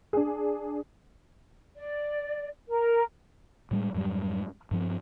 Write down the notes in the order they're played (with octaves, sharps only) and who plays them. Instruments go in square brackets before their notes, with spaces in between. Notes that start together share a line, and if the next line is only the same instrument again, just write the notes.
[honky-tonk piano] D4 G#4
[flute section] D5
A#4
[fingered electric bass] A2 G3 G#3
F2 G#2 F#3 G3
G2 F3 C4